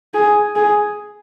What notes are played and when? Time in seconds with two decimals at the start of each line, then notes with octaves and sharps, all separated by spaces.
0.14 G#4
0.56 G#4